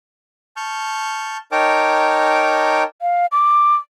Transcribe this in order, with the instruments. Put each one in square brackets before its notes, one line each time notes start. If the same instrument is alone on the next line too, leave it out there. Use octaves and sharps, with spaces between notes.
[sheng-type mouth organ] A5 C#6 F6 G6
D#4 A#4 C#5 G5 A5 D6
[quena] F5
D6